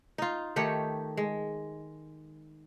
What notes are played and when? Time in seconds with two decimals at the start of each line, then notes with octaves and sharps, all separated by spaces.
0.18 D#4 F4
0.56 D#3 A3 G4 C#5
1.17 G#3